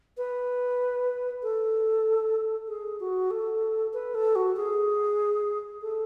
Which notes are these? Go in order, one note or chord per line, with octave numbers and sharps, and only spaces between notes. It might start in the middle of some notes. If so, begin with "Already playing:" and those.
B4
A4
G#4
F#4
A4
B4
A4
F#4
G#4
A4